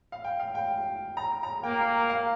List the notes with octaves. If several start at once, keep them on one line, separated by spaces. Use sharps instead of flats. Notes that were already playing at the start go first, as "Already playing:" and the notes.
F5
G5
F5
G5
A#5
A#5
A#3 G5
F5